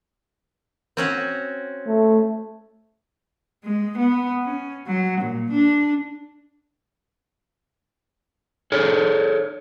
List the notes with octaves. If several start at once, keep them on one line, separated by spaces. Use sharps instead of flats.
C4 C#4 F#4
A3
G#3
B3
C#4
F#3
A#2
D4
G#4 A4 C#5